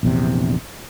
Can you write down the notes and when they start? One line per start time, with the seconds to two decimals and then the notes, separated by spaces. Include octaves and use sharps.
0.03 A#1 E2 C3